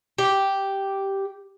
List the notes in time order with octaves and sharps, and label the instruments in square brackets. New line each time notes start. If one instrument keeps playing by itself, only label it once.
[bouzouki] G4